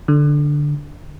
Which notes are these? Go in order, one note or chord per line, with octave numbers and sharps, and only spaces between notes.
D3